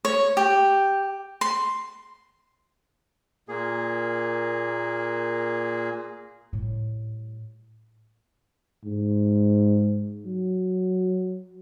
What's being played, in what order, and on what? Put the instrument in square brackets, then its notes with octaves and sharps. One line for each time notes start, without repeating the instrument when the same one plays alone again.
[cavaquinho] C#5
G4
C6
[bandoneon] A#2 A#3 G#4
[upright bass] A2 G3
[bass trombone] G#2
F#3